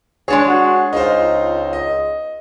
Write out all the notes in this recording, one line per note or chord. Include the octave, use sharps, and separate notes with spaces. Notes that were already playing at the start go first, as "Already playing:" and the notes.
G#3 D4 G#4 C#5
F#4
C#2 D#4 F4 C5
D#5